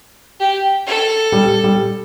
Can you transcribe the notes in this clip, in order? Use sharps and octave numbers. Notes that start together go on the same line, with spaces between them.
G4
A4
G3
G3